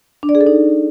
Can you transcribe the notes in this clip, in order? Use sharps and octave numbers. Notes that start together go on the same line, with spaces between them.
D4
D5
G#4
A4
D#4